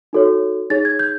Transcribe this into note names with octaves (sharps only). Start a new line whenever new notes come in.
D#4 F#4 A4 C#5
D#4 G#4 C#5 A6
G#6
G6